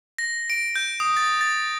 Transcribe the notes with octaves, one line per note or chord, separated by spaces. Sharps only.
A#6
D7
G6
D#6
A6
A6